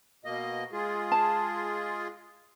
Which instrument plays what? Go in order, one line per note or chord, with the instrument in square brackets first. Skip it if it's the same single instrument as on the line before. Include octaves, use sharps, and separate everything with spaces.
[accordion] B2 A#3 D#5
G#3 F4 G#4
[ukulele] A5